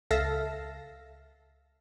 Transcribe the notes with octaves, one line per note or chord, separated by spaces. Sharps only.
C#2 A4 E5 F5 A5 A#6